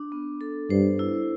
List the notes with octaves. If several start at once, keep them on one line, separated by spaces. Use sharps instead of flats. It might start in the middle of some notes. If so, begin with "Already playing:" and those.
Already playing: D4
B3
A4
G2 C5
E4